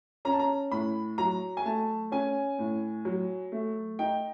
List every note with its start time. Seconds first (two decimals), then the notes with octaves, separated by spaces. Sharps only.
0.25 C#4 A#5
0.32 A5
0.39 A#5
0.71 A2 B5
1.18 F#3 A#5
1.57 G#5
1.65 A3 A5
2.12 C#4 G#5
2.59 A2
3.05 F#3
3.52 A3
3.99 D#4 G5